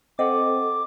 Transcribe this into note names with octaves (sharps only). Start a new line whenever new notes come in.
C4 A4 D#5 F#5 D6